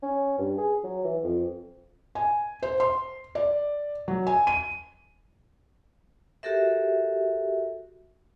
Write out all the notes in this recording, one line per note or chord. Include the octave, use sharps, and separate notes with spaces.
C#4
G2
G#4
F#3
E3
F2
G#5
C5
C6
D5
F#3
G#5
D#7
F#4 G4 A4 A#4 E5